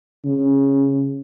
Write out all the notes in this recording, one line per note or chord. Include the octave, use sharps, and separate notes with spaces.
C#3